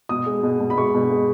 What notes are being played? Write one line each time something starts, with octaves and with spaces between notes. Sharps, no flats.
B2 D#6
G#3
B2
B2
B5
G#3 C#6
B2
G#3